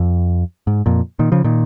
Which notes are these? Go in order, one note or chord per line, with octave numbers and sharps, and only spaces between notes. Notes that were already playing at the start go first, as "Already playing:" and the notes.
Already playing: F2
G#2
F2 A#2
A#2 D#3
C#3 F3
A#2 D#3